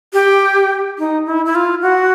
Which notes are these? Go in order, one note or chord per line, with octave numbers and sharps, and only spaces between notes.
G4
D#4
E4
E4
F4
F#4